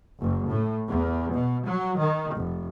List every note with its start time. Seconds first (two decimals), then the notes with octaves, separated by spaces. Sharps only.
0.21 F#1
0.50 A2
0.88 E2
1.33 B2
1.67 F#3
2.00 D#3
2.36 F1